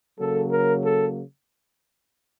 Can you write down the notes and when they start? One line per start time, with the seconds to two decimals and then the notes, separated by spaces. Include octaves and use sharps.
0.20 C#3 F#3 A#3 A4
0.52 A#4
0.83 A4